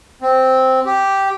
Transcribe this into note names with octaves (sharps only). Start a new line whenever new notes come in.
C4
G4